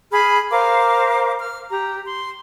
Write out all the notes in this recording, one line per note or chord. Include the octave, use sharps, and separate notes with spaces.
G#4 B5 F6
A#4 C5 F5 D6
F6
G4 A#5
C6